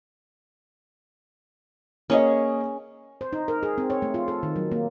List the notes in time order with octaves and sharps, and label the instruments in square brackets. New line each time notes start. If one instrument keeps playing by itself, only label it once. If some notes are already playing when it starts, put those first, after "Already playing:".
[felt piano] A#3 D#5 [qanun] C#4 G#4 C#5
[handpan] C5
D#4
A#4
G#4
C4
C#5
A3
F4
A4
D#3
F#3
A#3